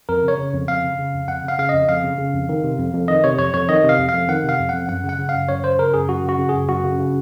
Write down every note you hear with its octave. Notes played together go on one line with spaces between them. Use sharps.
F2 A#4
C#3 C#5
C#3
F2
F2 F5
C#3
C#3
F2
F2 F#5
C#3 F5
C#3 F5
F2 D#5
F2 F5
C#3
C#3
F2
D#3
C3
F2
F2
D#3 D#5
C3 C#5
F2 C#5
F2 C#5
D#3 D#5
C3
F5
F2
F5
F2
D#3 F#5
C3
F5
F2
F2 F#5
F#2 F#5
C#3
F#5
C#3
F5
F#2
F#2 C#5
C#3 C5
C#3 A#4
F#2 G#4
F#2 F#4
C#3 F#4
C#3
G#4
F#2
F#2 F#4
C#3
C#3